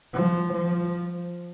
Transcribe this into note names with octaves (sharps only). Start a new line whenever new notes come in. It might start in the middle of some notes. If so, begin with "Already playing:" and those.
F3
F3